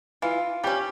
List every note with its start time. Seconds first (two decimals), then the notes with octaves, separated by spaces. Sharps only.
0.22 E3 F4
0.64 G3 C#4 G4